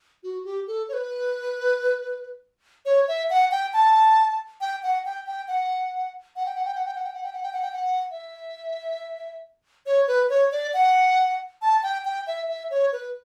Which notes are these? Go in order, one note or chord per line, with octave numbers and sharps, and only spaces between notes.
F#4
G4
A4
C#5
B4
C#5
E5
F#5
G5
A5
G5
F#5
G5
G5
F#5
F#5
G5
F#5
G5
F#5
G5
F#5
G5
F#5
G5
F#5
G5
F#5
G5
F#5
E5
C#5
B4
C#5
D5
F#5
A5
G5
G5
E5
E5
C#5
B4